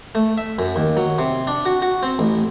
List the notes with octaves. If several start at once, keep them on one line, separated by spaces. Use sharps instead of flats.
A3
E5
F#2
D#2
F#3
C3
D4
F#4
F#4
C4
A1